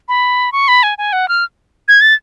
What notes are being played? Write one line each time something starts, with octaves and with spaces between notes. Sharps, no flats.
B5
C#6
B5
G#5
G#5
F#5
F6
G#6
A6